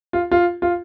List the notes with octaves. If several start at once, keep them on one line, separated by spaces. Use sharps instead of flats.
F4
F4
F4